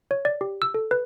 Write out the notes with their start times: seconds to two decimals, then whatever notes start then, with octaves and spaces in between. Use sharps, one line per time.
0.11 C#5
0.25 D5
0.41 G4
0.62 E6
0.74 A4
0.91 B4